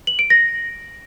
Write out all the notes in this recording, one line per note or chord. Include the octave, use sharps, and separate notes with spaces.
F#7
D7
A#6